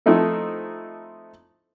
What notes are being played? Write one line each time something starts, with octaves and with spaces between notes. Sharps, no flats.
F3 A3 C4 D#4 E4 A4